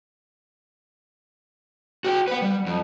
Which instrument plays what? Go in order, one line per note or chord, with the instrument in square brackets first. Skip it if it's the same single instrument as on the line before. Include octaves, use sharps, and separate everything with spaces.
[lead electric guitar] F#4 G5
B4 F#5
G3
F2